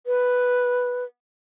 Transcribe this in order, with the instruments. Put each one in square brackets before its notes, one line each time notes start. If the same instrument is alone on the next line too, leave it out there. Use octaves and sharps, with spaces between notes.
[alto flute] B4